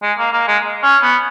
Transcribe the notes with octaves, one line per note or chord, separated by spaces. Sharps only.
G#3
A#3
A#3
G#3
C#4
B3